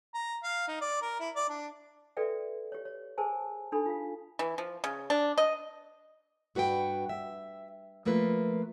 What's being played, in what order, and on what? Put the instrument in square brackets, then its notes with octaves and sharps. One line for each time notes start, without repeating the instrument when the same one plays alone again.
[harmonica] A#5
F5
D#4
D5
A#4
E4
D5
D4
[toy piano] F#4 A4 B4 D5 E5 G5
G4 C#5
C#5
G#4 A#4 C5 G#5 A5
D4 D#4 G4 A4 G#5 B5
F4 F5
[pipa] E3
F3
C#3
D4
D#5
[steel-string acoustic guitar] G2 F#4 B4 F#5 G5
E5
F3 A3 A#3 F4 B4